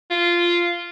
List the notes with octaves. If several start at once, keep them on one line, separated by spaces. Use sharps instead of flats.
F4